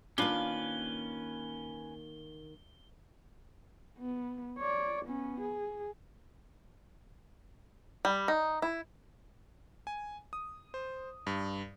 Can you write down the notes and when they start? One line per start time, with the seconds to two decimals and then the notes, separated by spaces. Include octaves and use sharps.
0.18 D#3 A#3 C#4 D4 F4 B4 G7
3.98 B3
4.58 C#5 D5
5.05 B3 C#4
5.40 G#4
8.05 G3
8.28 D#4
8.62 E4
9.87 G#5
10.33 D#6
10.74 C5
11.27 G2